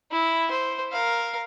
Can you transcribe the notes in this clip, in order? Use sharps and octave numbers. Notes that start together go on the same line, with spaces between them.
E4
C5
A#4 F5